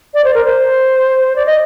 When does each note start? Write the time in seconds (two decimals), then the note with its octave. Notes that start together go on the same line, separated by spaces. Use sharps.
0.14 D5
0.24 C5
0.34 A#4
0.44 C5
1.36 D5
1.46 D#5